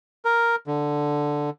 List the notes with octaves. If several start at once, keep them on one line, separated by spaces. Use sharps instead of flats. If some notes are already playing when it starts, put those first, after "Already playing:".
A#4
D3